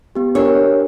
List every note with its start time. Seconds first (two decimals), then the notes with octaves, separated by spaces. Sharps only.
0.15 B3 G4
0.35 D4 G4 A#4 C#5